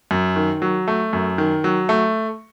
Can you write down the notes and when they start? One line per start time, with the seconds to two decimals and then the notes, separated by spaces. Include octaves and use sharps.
0.11 F#2
0.36 D#3
0.62 F#3
0.88 A3
1.13 F#2
1.38 D#3
1.64 F#3
1.89 A3